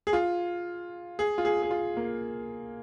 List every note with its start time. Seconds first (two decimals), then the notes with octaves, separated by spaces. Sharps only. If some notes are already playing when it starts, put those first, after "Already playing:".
0.07 G#4
0.13 F4
1.19 G#4
1.38 F4
1.45 G#4
1.63 G#4
1.71 F4
1.97 A#3